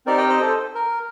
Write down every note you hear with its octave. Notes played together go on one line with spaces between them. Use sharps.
C4 D#4 G4 A#4 D5
D#5 G5
C5 D#5
A4 C5
A#4